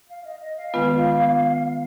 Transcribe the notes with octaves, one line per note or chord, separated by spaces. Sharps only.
F5
D#5
D#5
F5
D#3 G#3 B3 F4 B4